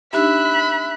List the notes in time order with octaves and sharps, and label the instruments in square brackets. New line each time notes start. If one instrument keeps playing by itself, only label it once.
[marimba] D4 D#4 G4 [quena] E5 [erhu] B5 [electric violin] F#6